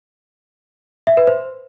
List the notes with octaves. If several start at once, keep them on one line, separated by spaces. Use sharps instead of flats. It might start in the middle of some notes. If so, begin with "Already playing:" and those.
E5
B4
C5